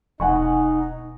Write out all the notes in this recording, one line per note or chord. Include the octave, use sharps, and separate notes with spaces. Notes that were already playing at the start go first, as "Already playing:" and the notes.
D#1 B2 D#4 F#5 G#5 C#6